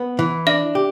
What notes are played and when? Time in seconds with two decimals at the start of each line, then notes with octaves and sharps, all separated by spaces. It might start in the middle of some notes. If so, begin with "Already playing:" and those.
Already playing: B3
0.19 E3
0.47 D4 E5
0.75 G4